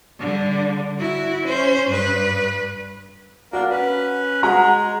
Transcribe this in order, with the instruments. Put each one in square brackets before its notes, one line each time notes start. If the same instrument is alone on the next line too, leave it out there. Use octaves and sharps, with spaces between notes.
[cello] D3 G3
E4 F#4
C#4 C5
G2 B4
[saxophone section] A#3 D4 [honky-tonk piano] F#4
[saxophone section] C#4 B4
[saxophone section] G#3 [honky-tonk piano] F#4 F#5 A#5